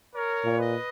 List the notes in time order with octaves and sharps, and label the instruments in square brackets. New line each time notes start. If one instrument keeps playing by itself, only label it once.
[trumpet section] A#4 C#5
[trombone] A#2
[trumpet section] B4 D#5